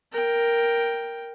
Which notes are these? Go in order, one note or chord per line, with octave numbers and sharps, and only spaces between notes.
A#4 G5